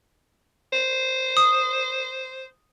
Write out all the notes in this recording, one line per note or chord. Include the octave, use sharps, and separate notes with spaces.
C5
D#6